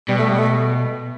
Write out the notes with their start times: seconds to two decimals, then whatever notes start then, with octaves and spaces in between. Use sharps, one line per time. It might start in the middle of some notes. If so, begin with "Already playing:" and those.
0.09 B2 G3
0.18 A3
0.29 G3
0.38 A3